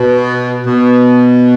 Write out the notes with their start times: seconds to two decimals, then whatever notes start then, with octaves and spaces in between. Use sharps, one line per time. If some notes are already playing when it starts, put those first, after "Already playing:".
Already playing: B2
0.66 B2